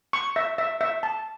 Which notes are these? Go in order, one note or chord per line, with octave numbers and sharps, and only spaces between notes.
C#6
E5
E5
E5
A5